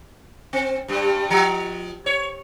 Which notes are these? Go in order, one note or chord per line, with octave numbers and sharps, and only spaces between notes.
C4
G2 G3
F3
C#5